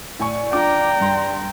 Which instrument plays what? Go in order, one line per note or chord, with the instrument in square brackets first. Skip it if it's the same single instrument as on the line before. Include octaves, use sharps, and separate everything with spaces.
[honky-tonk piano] A2 G#5 C#6 [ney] D5
[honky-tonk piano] D4 F4 D6 [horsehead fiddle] G5 A#5
[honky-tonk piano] G2 C6